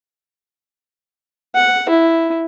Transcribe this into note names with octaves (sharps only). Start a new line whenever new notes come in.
F#5
E4